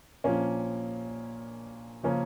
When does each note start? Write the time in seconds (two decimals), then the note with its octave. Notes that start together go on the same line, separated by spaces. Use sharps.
0.24 A#1 A#2 F3 A#3 C#4
2.03 C#3 F3 A#3 C#4